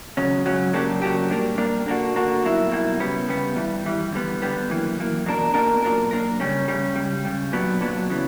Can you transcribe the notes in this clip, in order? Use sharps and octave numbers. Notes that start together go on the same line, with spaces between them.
C#2 C#3 F#3 C#4
C#2 C#3 F#3 C#4
C#3 F#3 A#3 D4 G4
C#3 F#3 A#3 D4 G4
A#2 G3 A#3 D4 A#4
A#2 G3 A#3 D4 A#4
D3 A#3 D4 F#4
D3 A#3 D4 F#4
B1 B2 G3 A#3 E4
B1 B2 G3 A#3 E4
C#3 G3 B3
C#3 G3 B3
G2 E3 G3
G2 E3 G3
D3 G3 B3
D3 G3 B3
F#2 E3 A#3
F#2 E3 A#3
B2 A#3 D4 A#4
B2 A#3 D4 A#4
B1 A#2 A#3 D4 A#4
B1 A#2 A#3 D4 A#4
C#3 G3 C#4
C#3 G3 C#4
C#2 C#3 G3
C#2 C#3 G3
B1 A#2 F#3 B3 D4
B1 A#2 F#3 B3 D4
C#3 E3 B3